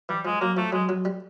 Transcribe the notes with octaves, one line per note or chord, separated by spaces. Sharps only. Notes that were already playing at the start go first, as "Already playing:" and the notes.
E3 G3
F3 G#3
F#3 A#3
F3 A3
F#3 G#3
F#3
G3